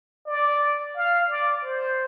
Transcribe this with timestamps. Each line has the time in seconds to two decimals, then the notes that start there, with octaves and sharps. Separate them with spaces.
0.27 D5
0.96 F5
1.29 D5
1.64 C5